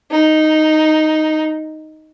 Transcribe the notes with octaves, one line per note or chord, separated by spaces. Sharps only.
D#4